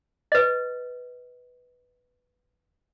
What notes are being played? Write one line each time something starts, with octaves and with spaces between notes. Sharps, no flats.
B4 D#5